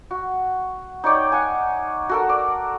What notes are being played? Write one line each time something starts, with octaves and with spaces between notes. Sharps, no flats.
F#4
D#4 C#5 D5 G5
F#5 G#5
F#4 A4 A#4
D5